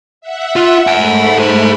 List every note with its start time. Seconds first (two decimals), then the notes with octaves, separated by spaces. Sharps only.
0.21 E5 F#5
0.56 F4
0.87 G#2 A3 F#5 G#5 B5
1.38 G#4 C5